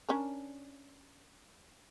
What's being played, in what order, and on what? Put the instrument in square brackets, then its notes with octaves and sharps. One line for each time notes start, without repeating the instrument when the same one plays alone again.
[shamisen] C#4 D4 A#4